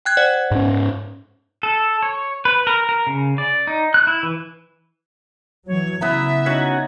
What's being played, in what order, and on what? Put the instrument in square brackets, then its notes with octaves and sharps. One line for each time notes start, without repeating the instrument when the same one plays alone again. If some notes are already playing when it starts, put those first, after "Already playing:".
[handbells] G5 F#6 G#6
C5 D5 F#5
[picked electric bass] G#2 C#4
[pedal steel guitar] A4
C#5
B4
A#4
A#4
C#3
D5
D#4
F#6
E4
E3
[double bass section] E3 F#3 [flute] C#5
[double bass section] C#3 [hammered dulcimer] B3 E4 A#5 [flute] E5
[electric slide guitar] C#4 F#4 [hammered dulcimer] D#4 F#5